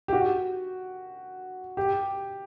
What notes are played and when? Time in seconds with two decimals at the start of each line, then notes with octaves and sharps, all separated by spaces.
0.08 G4
0.13 F#4
1.77 G4